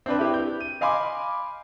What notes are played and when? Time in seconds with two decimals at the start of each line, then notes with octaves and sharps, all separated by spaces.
0.06 C4 D4 B4
0.19 E4 G4
0.34 G6
0.61 D#7
0.81 D#5 F5 G#5 B5 C6 D6